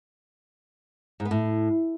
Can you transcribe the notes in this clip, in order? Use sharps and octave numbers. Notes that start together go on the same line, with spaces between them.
G#2
B3
A2